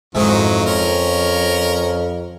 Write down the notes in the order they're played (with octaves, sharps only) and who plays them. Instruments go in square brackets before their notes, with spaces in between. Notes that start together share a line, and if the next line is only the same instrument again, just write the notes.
[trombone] F2 [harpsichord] G#2 E4 G#4 [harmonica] D#3 F#3
[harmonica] C#4 A#4 [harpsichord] C6